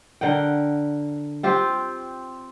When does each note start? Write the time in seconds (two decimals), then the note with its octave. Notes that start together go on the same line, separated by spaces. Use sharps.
0.21 D3 A#4 F#5 G5
1.43 C4 F4 G4